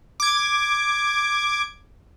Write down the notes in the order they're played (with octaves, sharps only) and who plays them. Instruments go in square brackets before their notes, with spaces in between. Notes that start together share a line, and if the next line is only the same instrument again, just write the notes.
[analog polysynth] D6 G#6